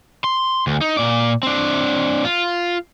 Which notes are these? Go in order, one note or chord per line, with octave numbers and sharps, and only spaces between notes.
C6
D2
D#4
A#2 D5
C4 D4
F4